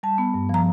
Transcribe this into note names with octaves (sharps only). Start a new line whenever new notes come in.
G3 A5
B3
G2
F3 A#5